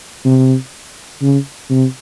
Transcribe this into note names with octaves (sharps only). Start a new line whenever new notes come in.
C3
C#3
C3